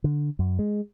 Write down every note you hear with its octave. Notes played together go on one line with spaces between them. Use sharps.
D3
F#2
G#3